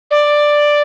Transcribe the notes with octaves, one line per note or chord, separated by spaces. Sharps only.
D5